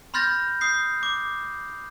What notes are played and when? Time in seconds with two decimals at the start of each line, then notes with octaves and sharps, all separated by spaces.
0.14 B5 C6 F6 G6 A6 A#6
0.61 D#6 G6 C7
1.03 D6